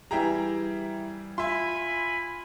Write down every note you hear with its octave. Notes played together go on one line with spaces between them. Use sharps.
E3 G3 E4 G#4 G5 A#5
F4 E5 G#5 B5 C6